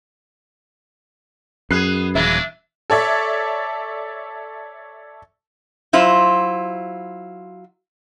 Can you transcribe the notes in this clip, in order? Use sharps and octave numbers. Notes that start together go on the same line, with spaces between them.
F#2 B3 G#4 F#6 C7
D#1 C#3 E3 F#3 D4 E5
A4 C#5 D5 E5
F#3 E4 F4 C5